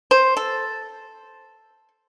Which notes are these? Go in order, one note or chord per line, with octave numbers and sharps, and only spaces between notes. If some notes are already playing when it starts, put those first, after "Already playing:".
C5
A4